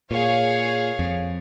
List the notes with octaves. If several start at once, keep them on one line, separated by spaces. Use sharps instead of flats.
A#2 G#4 C#5 F5
F2